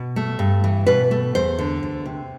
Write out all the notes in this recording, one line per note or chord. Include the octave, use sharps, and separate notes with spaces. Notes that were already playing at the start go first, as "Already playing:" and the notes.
Already playing: B2
A3
G2
E3
B2 B4
A3
E2 C5
D3
D2
C3